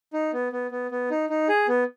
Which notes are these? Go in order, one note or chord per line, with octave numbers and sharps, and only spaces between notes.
D#4
B3
B3
B3
B3
D#4
D#4
G#4
B3